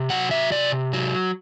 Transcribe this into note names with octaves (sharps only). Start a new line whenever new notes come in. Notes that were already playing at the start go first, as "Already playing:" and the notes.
Already playing: C3
F#3 F#5
E5
C3 D5
F#3